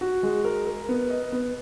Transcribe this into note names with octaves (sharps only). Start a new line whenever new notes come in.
F#4
G#3
A#4
A#4
B3
D#5
B3